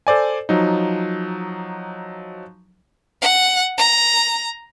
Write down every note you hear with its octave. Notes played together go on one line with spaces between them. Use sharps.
A4 C5 D5 G#5
F3 F#3 D#4
F#5
A#5